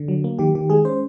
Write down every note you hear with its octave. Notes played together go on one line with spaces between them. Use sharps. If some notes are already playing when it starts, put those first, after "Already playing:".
Already playing: D3
F#3
A#3
D#3 G4
D#3 G4
G#3 G#4
C#4 C5